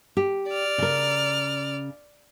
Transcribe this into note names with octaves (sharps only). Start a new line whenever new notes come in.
G4
D5 F6
C#3 A#4